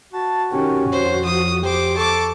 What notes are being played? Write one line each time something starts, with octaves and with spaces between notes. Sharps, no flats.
F#4 A5
D#3 C#4 G4
F2 C5 C#5
F3 D#6
G4 C5 D6
A4 A5 C#6 D6